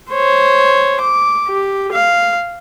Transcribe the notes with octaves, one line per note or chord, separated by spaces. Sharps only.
C5 C#5
D6
G4
F5